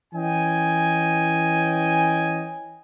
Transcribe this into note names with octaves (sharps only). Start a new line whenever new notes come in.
E3 C#4 D#5 G5 G#5